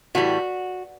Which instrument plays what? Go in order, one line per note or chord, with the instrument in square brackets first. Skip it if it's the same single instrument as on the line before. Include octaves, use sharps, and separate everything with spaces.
[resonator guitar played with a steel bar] A2 E3 G3 F#4